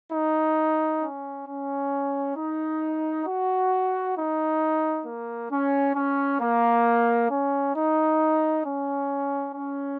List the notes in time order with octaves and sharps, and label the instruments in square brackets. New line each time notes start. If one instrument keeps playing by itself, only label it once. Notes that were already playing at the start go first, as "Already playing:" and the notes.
[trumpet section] D#4
C#4
C#4
D#4
F#4
D#4
A#3
C#4
C#4
A#3
C#4
D#4
C#4
C#4